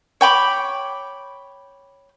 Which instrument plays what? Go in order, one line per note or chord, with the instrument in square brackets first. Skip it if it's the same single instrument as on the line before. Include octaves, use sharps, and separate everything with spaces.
[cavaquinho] C#5 G5 B5 D6